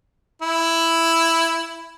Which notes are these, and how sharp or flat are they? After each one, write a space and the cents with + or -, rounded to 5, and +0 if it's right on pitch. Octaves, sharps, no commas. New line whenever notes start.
E4 +5